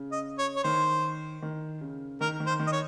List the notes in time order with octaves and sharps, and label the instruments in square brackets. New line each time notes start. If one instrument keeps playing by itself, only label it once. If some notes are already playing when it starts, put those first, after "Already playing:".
Already playing: [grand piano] C#3
[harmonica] D#5
C#5
C#5
[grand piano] D#3 [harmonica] C5
[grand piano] D#3
C#3
[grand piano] D#3 [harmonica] A#4
[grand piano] D#3
[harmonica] C5
[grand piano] D#3
[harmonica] D#5
C#5